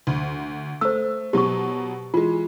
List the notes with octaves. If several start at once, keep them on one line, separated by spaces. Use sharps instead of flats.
D2
A3 C5 E6
B2 F#3 G4 C#6
E3 G#3 F4